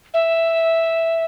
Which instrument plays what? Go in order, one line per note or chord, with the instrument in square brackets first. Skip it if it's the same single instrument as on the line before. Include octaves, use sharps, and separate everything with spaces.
[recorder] E5